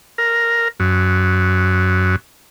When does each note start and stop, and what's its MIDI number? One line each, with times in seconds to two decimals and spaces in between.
0.18 0.68 70
0.80 2.16 42